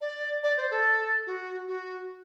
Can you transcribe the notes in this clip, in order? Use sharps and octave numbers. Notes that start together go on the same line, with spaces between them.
D5
D5
C5
A4
F#4
F#4